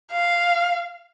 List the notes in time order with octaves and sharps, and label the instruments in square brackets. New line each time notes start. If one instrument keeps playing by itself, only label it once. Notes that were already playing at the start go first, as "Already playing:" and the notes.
[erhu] F5